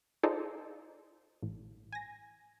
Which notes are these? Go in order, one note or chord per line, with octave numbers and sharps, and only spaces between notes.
D#4 F4 G#4 A4 C5 D5
A1
G#5 A#6